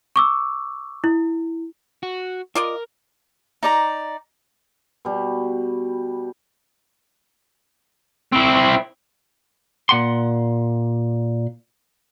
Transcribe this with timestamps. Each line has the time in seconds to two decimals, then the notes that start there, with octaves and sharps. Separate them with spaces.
0.16 C#6 D6 E6
1.04 E4
2.03 F#4
2.55 F4 A#4 D5 D#5
3.63 D#4 D5 A#5
5.05 B2 G3
8.32 C4 E4
9.89 A#2 F#5 C6